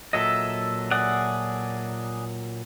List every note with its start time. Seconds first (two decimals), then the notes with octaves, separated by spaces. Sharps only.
0.13 A#2 F#3 A4 D#5 E5
0.91 G#4 D5 F#5